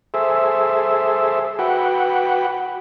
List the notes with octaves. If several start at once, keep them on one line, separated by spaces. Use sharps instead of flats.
G#4 A4 C5 E5
F#4 B4 F#5 G5